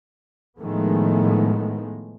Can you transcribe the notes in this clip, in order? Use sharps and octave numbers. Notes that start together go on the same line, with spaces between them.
A2 D#3 F3 G#3 A3 B3